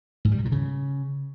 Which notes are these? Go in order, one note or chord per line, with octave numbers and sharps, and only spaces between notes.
G#2
G3
C3
A#2
C#3